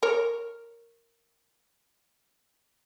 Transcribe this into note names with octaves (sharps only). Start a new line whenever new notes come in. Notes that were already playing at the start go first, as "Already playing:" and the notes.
A#4 C#5